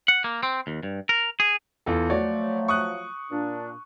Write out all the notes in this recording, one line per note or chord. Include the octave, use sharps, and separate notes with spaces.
F#5
A#3
C4
D#2
G2
A#4
G#4
E2 F4 A4
F3 F#3 A3 F#4 C#5 D5
C#6 D#6 F#6
A#2 D4